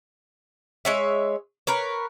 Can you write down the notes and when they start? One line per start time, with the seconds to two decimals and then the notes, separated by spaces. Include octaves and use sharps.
0.85 G#3 C#5 E5
1.67 A#4 B4 C#5